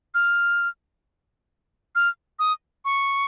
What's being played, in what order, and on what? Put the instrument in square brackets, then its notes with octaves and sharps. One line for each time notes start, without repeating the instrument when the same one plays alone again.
[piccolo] F6
F6
D#6
C#6